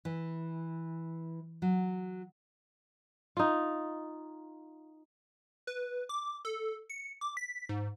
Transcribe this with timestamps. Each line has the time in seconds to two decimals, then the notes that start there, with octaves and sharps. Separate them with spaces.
0.05 E3
1.62 F#3
3.37 D#4 F4
5.67 B4
6.09 D6
6.45 A4
6.89 C#7
7.21 D6
7.37 B6
7.69 G#2